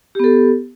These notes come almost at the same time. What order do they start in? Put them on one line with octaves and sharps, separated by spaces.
G4 B3 A4